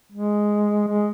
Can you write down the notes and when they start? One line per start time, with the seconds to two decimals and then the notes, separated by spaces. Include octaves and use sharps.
0.12 G#3
0.87 G#3